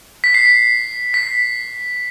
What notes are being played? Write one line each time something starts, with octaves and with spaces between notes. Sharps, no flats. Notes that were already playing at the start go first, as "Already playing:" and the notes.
B6
C7
B6
B6